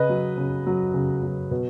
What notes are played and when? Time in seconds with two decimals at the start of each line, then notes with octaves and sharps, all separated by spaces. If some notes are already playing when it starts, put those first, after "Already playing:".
Already playing: C#3 B4 D#5
0.09 F#3
0.37 C#3
0.67 F#3
0.94 C#3
1.23 F#3
1.51 B2